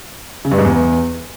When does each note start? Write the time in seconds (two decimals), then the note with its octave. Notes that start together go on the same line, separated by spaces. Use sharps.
0.45 C#3
0.51 G2
0.58 G#2
0.65 E2